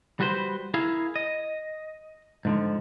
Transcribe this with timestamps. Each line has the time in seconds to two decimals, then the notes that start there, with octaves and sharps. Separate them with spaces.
0.20 G3 F#4 B4 C5
0.74 E4 G#4 A#4 F5
1.16 D#5
2.45 G#2 D3 F3